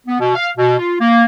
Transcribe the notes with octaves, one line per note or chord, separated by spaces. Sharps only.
B3
B2
F5
B2
F4
A#3